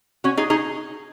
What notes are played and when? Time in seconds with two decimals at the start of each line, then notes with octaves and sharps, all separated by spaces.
0.24 C#4 F#4
0.37 D#4 G#4
0.50 D#4 G#4